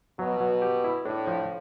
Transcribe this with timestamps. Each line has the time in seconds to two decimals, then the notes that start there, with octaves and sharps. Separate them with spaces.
0.19 B2 F#3
0.41 F#3
0.62 G4
0.84 E4
1.05 A2 D4
1.27 F3